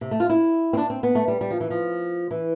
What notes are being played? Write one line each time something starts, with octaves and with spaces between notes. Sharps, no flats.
C3
A3
F4
E4
C4
D4
C4
B3
A3
G3
G3
F3
E3
F3
E3